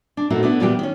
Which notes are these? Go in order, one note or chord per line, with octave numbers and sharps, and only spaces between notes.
D4
A#2 A3 C4 D#4 E4 F#4
B3 D4 E4
A#2 E3 G3 B3 D4 G4
D#3 C#4